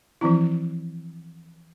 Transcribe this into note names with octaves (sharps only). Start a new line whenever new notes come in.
E3 F3 C4 E4